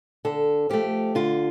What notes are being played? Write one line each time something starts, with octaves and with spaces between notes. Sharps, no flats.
D3 A4
F3 A3 G4
D3 F4